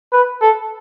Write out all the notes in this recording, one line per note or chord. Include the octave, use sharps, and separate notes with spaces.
B4
A4